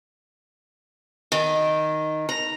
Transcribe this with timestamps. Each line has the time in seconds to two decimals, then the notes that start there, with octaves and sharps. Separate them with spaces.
1.32 D#3
2.29 A#5